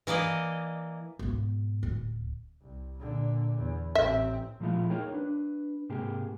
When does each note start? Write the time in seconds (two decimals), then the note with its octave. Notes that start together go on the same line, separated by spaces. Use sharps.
0.07 E3 A#3 D5 D#5
1.19 G#2 B2
1.83 D1
2.62 C2
2.99 A#2 D3
3.57 E2
3.95 A1 C4 E5
4.60 A#2 F3 G#3 A3 E4 F4
4.90 D#4 G#4 A#4 C#5 G5
5.14 D4 B4
5.89 G#2 C3 A#3 G4 G#4